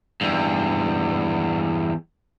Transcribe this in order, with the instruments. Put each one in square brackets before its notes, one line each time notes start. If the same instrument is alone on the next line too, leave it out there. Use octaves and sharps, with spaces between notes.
[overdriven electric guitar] E2 G2